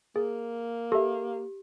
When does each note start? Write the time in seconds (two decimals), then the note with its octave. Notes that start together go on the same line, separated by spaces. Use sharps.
0.16 A#3 G#4
0.92 G4 A4 E5